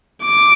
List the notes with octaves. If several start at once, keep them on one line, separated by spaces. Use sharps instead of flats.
D6